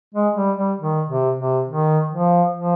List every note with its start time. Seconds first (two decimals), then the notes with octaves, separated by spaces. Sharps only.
0.14 G#3
0.36 G3
0.58 G3
0.80 D#3
1.09 C3
1.39 C3
1.68 D#3
2.12 F3
2.57 F3